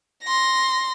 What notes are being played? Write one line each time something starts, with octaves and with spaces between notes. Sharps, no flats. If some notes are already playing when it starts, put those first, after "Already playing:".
C6 A#6